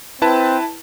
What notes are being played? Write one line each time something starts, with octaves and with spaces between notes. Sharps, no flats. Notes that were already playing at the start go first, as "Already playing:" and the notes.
C4 E4 B4 A5